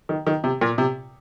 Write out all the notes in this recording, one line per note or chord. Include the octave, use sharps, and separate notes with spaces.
D#3
D#3
C3
A#2
C3